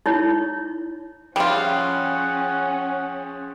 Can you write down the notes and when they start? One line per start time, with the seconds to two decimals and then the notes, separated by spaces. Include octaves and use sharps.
0.06 D#4 E4 C#5
1.36 F3 G3 C#4 F4 G#4 F#5 G5